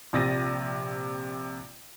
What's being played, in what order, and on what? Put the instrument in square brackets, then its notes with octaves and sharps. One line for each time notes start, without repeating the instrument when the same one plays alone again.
[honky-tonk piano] A#1 C3 A6 A#6 D#7